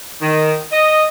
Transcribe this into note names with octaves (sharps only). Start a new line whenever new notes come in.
D#3
D#5